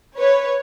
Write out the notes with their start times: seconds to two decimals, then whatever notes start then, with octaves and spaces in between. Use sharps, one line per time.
0.18 B4 C#5